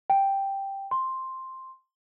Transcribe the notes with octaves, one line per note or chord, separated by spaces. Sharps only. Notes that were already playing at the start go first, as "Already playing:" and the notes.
G5
C6